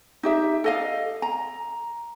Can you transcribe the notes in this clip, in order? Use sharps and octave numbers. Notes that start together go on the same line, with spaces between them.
D#4 G4 E5
A4 D#5 F5
A#5